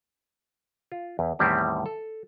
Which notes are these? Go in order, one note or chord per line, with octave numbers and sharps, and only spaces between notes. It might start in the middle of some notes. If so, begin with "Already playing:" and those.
F4
E2
E2 A2 D#3 G3 C4 E4
A4